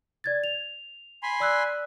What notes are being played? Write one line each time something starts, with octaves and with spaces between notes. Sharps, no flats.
D5 G#6 A6
F7
G#5 B5 C6
D5 E6 F#6